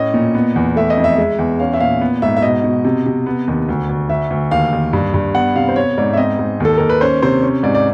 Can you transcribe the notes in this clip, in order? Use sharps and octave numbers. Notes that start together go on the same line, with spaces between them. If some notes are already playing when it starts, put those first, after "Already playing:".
Already playing: A2 C#4 D#5
A#2
B3
E2
A3 E5
D#5
F2
E5
G#3
E2
C#4 F5
E5
A#2 F5
B3
G#2 E5
E5
B2 D#5
B2
C3
C3
B3
D#2
D2
D2
D2 E5
D2
D#2 F5
D#2
G2
G2
B3 F#5
C3 F5
C5
B3 C#5
G#2 D5
E5
C4 D#5
G#2
D#2 A4
D#2 A#4
B4
C#4 C5
C3 C5
C#4
G#2 D5
D5